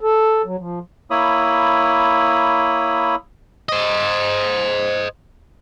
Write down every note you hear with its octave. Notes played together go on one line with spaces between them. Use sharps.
A4
F#3
F3
A#3 E4 C#5 B5 D#6
C5 D#5